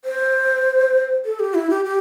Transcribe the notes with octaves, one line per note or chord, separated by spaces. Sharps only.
C5
A4
G4
E4
G4
G4